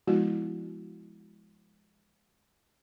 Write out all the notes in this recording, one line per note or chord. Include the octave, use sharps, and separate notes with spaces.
F3 G#3 B3 E4 F#4